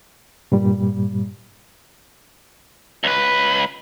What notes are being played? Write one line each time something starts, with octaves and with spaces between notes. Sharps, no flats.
G2 A#2 G3
C#2 B4